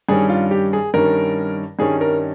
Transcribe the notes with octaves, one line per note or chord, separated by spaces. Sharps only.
G2 D#3 G3 C#4 G#4
F4
G4
G#4
G2 D#3 G3 C#4 A#4
G2 D#3 G3 C#4 G#4
A#4